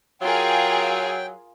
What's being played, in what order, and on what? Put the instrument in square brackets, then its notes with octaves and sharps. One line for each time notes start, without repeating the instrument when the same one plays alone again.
[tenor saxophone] F#3 [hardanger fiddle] F4 A#4 [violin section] G#4 F5 G#5 [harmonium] G5